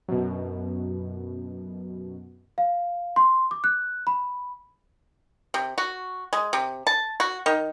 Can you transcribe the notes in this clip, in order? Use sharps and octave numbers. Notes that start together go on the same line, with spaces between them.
F#2 B2
F5
C6
D6
F#6
B5
C3
F#4
G#3
C3
A5
F#4
D#3